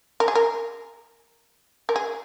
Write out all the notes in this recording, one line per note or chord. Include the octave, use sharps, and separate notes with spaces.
A#4
G#4
A#4
A#4
G#4